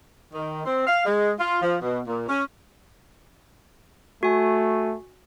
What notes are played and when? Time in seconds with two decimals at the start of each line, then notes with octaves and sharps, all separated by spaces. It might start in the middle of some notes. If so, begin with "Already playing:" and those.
0.33 D#3
0.65 C4
0.87 F5
1.06 G#3
1.39 F4
1.62 F3
1.82 B2
2.06 A#2
2.28 C#4
4.23 A3 F#4 G#5